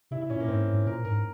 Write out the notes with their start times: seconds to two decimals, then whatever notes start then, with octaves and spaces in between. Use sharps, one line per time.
0.11 C3 E4
0.21 E4
0.30 A#2 C#4
0.40 A#3
0.48 G#2 C4
0.67 G#2
0.86 A#2 A#4
1.05 G#2 A#4